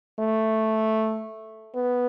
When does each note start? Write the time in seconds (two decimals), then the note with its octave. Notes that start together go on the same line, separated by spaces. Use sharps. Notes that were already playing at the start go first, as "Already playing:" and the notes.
0.20 A3
1.75 B3